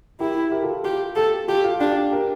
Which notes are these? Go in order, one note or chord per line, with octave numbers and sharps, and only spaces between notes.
E4 G4 A#4
G4 A#4
F4 A4
F4 G4
G4 A4
F4 G4 A4
F4
D4 G4
G4
G4 A#4